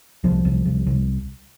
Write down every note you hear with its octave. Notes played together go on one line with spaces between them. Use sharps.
C2 F3
C2
C2
C2